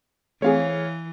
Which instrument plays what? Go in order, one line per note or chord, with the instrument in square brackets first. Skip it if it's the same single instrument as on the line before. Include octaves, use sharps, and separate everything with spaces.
[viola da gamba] E3 [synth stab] A3 C4 G#4 [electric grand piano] C#5 F5